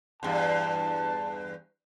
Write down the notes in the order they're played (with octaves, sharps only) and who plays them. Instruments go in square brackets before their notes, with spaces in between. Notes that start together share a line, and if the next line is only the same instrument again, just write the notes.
[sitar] E2 G2 [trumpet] A5